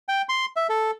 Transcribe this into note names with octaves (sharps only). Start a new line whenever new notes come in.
G5
C6
E5
A4